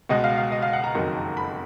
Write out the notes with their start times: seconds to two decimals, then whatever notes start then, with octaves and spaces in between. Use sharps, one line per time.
0.09 C#2 B2 G#3 D#5
0.24 F5
0.38 F5
0.52 D#5
0.62 F5
0.73 F#5
0.84 A#5
0.95 F#1 F2 D#3 F#3
1.37 B5